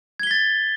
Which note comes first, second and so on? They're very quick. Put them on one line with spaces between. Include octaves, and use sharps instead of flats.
G#6 G7 B6 A6